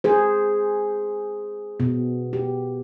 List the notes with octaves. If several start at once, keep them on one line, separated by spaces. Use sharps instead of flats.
G#4 C5
B2
G4